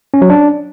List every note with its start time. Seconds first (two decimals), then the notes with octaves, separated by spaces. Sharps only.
0.14 C#4
0.22 F#3
0.30 D4